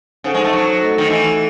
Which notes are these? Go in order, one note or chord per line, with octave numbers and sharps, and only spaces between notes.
C#3 D#4 A4 C5 F#5
G#3
A3
F#3
A3 D#4 A4 D#5 F#5
D#3
E3